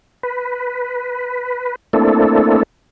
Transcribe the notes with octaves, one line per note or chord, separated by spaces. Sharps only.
B4
A3 A#3 C4 D4 E4 A4